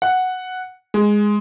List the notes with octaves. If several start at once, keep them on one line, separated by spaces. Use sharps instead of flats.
F#5
G#3